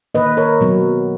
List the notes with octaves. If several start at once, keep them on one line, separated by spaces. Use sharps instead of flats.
D#3 A#3 B4 D#5
A#4 C#5
B2 F#3 B3